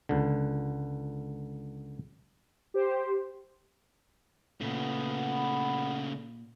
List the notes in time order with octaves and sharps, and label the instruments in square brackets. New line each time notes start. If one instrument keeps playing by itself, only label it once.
[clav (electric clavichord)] C#2 D3
[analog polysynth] G4 C5
[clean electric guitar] A#2 [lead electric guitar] C#3 A3 [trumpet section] B3